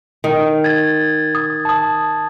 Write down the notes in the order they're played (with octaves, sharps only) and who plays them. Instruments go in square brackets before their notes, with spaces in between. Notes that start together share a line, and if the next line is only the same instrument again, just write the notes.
[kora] D#3
[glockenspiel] G#6 A6
D#6
A5 D#6